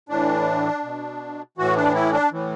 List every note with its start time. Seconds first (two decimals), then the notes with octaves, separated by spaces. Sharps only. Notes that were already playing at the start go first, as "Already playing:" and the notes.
0.09 A2 E3 D4
0.83 B2
1.57 A2 E3 F#4
1.76 D4
1.94 E4
2.13 D4
2.32 A2 E3